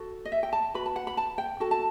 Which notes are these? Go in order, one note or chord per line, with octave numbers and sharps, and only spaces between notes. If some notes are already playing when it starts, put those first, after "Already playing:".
Already playing: F#4 A4
D#5
E5
G5
A5
F#4 B4 B5
A5
F#5
B5
A5
G5
F#4 A4 A5
A5